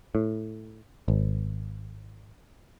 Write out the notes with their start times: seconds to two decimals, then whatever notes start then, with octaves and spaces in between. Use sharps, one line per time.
0.15 A2
1.08 G#1